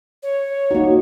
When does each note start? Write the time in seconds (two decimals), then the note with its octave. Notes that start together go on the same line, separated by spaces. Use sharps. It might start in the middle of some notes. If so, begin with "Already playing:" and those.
0.23 C#5
0.71 A#3 D#4 F#4